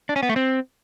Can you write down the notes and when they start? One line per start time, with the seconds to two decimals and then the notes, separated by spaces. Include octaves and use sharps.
0.09 D4
0.16 C#4
0.23 B3
0.29 A3
0.36 C4